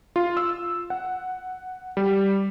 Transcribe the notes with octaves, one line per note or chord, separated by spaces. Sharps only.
F4
E6
F#5
G3